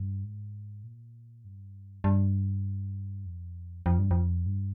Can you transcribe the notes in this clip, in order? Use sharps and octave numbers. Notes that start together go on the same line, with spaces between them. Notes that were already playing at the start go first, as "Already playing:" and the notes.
Already playing: G2
G#2
A#2
G2
G2
F2
F2
G2
F2
G2